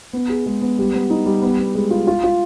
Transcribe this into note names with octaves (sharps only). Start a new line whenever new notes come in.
B3
G#4
G#3
B3
G3
B3
D#4
G3
B3
B3
G#3
F4
F4
F4